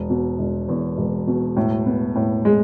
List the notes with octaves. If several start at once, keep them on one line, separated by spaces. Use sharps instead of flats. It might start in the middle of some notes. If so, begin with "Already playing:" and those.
Already playing: E1
B2
E1
E2
E1
B2
A2
B3
A2
G#3